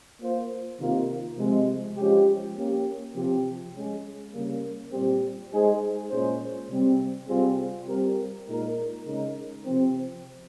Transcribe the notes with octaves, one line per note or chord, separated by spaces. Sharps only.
A#3 F4 C5
C3 D#3 A#3 F4 A#4
C3 F3 G#3
F3 G#3 C#4 G4
A#3 C#4 G4 A#4
C3 F3 C4 G4
G#3 C#4 G#4
C#3 G3 A#3
A#2 G3 C4 G4
G#3 D#4 G#4 C5
A#2 G#3 C#4 G#4 C5
C3 G3 C4
C3 G3 C4 F4 G#4
G3 C4 G4 A#4
A#2 G#3 D#4 A#4
C#3 G#3 D#4 A#4
C3 F3 C4